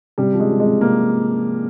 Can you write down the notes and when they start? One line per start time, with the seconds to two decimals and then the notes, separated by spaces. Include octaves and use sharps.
0.18 C3 G3
0.34 F3
0.40 G#3
0.50 F3
0.60 G#3
0.65 C3
0.81 C3 A#3